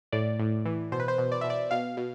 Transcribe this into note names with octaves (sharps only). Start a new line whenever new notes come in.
A2 D5
A2
E3
B2 C5
B4
C5
B2
D5
B2 E5
D5
B2 F5
B2